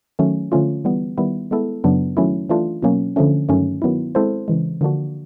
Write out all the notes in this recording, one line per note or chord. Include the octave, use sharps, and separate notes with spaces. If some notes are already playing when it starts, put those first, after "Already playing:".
D#3 F#3 A3 C#4
D3 F3 A3 C#4 F4
E3 G3 B3
D#3 G3 B3 E4
G#3 B3 E4 A4
F#2 C#3 F#3 B3 D4
D#3 F#3 A3 C#4 E4
E3 A3 D4 F4
B2 F#3 A#3 C#4
D3 F3 A3 C#4
G2 D#3 F#3 A3 C#4
D#3 F#3 B3 E4
G#3 C4 E4 A4 C5
C#3 E3 G#3
D3 F3 A#3 D4 F#4